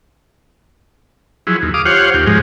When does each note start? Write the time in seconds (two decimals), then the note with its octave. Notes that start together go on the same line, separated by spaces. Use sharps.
1.47 F3 F#3 E4 G#4
1.62 D#2
1.74 F5 D6 D#6
1.85 F4 G4 C5 C#5 F5 F#5
2.14 D#2 G4
2.26 G#2 F3 G#3